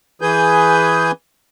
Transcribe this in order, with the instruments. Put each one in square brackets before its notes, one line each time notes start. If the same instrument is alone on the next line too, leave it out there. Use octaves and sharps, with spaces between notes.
[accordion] E3 G#4 B4 G#5 G6